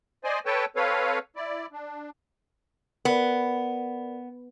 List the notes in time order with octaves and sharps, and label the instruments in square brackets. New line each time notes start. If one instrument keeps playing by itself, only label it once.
[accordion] C5 D5 D#5 G#5
A4 B4 C#5 G5 A5
C4 A4 B4 C#5 F5
E4 D5
D4
[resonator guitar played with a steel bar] B3 [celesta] A#4 D5